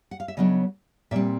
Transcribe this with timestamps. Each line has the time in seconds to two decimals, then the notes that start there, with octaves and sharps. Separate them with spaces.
0.11 F#5
0.20 F5
0.28 E5
0.37 C#3 F#3 B3 D4 C#5 D#5
1.11 A#2 G3 C4 D5 E5